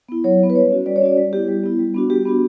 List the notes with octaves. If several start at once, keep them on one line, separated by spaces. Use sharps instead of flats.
B3 E4
F#3 C#5
B3 E4
B4
G3 C#5
C#4 F#4
G3 D5
C#5
C#4 F#4 D5
G3
B3 E4 G4
G3
B3 E4
G3
B3 D4 F#4
G3 G4
B3 D4 F#4